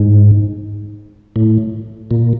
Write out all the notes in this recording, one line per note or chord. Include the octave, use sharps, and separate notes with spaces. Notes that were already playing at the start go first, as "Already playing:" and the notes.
Already playing: G#2
A2
A#2